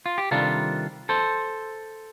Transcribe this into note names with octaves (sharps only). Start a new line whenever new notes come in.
F4
G4
C3 D#3 G3 D4 F4 A4
A4 C5